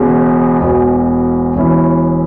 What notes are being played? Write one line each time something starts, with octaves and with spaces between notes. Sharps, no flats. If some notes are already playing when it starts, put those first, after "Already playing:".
Already playing: E1 E2 C#3
E1 E2 B2
E1 E2 E3 C#4 E4